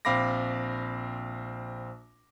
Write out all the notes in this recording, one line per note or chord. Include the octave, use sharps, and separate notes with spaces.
A#1 C4 F5 B5 D6 A#6